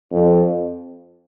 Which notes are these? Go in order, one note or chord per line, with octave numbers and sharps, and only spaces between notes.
F2